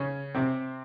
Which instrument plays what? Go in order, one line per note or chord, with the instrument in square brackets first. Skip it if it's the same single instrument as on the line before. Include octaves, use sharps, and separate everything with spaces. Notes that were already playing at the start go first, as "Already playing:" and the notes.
Already playing: [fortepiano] C#3 C#4
C3 C4